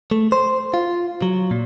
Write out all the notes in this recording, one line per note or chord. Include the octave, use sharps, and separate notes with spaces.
A3
C5
F4
F#3
A#2